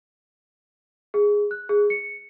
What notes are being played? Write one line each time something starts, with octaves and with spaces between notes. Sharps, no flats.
G#4
F#6
G#4
C#7